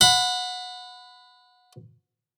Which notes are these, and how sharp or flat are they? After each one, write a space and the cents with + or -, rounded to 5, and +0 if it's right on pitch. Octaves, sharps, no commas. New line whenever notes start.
F#5 -25 B5 +15